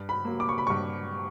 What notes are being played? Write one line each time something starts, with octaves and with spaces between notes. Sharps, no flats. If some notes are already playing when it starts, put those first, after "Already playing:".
Already playing: G2
B5
F#3 A#3
D6
C#6
B5
G2 C#6